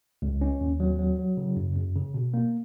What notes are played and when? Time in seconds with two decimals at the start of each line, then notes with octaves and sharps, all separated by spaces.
0.22 C#2
0.41 C#4
0.61 D#2
0.80 F#3
0.99 F#3
1.19 F#3
1.37 C#3
1.56 F#2
1.76 F#2
1.96 C#3
2.14 B2
2.34 A#3